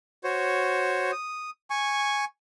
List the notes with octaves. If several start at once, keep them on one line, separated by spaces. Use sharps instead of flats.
F#4 C5 C#5
D#6
G#5 C#6